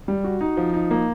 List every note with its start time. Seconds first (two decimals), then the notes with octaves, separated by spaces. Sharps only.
0.08 G3
0.24 F#4
0.41 D#4
0.57 F3
0.74 D#4
0.91 A#3